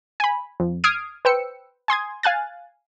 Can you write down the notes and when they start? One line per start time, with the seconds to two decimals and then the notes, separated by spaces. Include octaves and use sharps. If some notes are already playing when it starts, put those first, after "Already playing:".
0.20 G#5 B5
0.60 F2
0.84 D#6 F6 G#6 C7 D7
1.25 B4 C5 G5 E6 C#7
1.88 G#5 C6 D#6 G#6
2.23 F5 G#5 F#6 A6